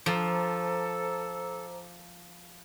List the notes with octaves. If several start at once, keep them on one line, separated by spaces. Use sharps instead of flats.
F3 A4 C5 A#5 D6